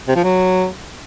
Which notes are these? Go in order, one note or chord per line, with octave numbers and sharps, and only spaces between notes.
C3
F3
F#3